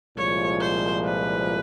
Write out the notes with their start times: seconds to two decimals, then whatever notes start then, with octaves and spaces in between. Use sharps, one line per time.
0.17 C2 A#2 F3 G#3 C#5
0.60 C5
1.05 B4